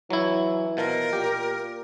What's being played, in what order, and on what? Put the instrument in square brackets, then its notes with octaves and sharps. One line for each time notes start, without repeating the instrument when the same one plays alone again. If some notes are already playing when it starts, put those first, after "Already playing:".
[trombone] E3 [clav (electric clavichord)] F#3 E4
[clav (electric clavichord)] B2 F3 [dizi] A#4
[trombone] A#2 [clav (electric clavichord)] G4